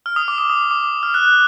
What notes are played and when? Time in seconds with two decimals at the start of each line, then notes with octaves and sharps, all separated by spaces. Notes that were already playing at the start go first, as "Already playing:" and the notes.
0.06 F6
0.16 D#6
0.28 D6
0.38 D#6
0.50 D#6
0.71 D6
1.03 F6
1.14 F#6
1.25 F#6